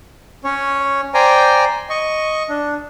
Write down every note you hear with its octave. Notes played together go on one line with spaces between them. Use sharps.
C#4 C#5
C5 D5 G5 G#5 A#5
D#5 C#6
D4